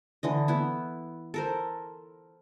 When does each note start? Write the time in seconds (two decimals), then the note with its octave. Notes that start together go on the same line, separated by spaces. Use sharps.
0.23 D3 E3 D#5
0.48 B3 E4
1.34 A4 A#4 C5